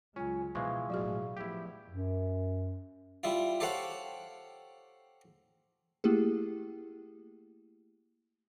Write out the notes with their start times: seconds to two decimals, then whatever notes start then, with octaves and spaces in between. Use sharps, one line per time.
0.16 C#2 F#3 G#3 C#4 F4 G#5
0.55 B2 E3 F3 G#3 F5 C#6
0.90 A1 B2 F#3 F#4 G#4
1.37 F3 B3 E4 G4
1.89 F#2
3.24 G3 E4 F4
3.60 G4 A4 C5 C#5 F5 F#5
6.04 A3 A#3 E4 G4 G#4